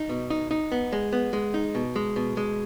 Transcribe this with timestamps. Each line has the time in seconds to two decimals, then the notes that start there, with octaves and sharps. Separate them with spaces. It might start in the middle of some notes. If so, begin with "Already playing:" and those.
Already playing: D#4
0.09 B2
0.30 D#4
0.51 D#4
0.72 B3
0.92 G#3
1.13 B3
1.33 G#3
1.54 D#4
1.75 B2
1.96 G#3
2.16 B2
2.37 G#3